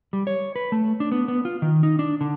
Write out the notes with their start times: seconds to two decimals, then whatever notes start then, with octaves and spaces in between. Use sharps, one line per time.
0.13 G3
0.27 C#5
0.56 B4
0.72 A3
1.00 D4
1.12 B3
1.28 B3
1.45 F4
1.62 D#3
1.83 D#4
1.99 D4
2.21 D3